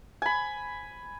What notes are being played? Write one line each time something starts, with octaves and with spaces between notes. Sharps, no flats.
G#5 B5